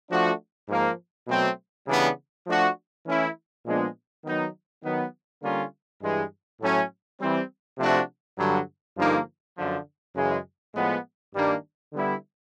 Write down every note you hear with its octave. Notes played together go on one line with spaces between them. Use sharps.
F3 A3 D4 F#4
G#2 F3 A#3
B2 F#3 A3 C4
C#3 E3 G3 B3 D4
F3 A3 D4 F#4
E3 A3 C#4 E4
A#2 F3 G#3 B3 D4
D#3 F#3 B3 D#4
D#3 F#3 B3
D3 G3 A#3 C#4 F4
G2 E3 G#3
A2 F#3 A3 C#4
E3 G3 C4
C3 F3 A3 D4 F#4
G2 D3 F#3
G2 D3 F3 A#3 D#4
F#2 D3 F3
F#2 C#3 E3 G#3
A2 F3 G#3 B3
G2 D#3 G3 A#3 D4
D3 G3 B3 E4